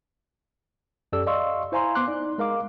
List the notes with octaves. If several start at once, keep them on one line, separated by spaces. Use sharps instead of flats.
F#2 G4 A4 D5 E6
D5 D#5 F5 C6 C#6 E6
E4 C5 F5 G#5 A#5 C6
B3 C6 D6 F#6
D#4 D5
G#3 A#4 F5 D6